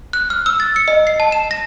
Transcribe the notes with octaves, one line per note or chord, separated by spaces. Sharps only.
F#6
F6
E6
A6
C#7
D#5
C7
A5
E7
A#6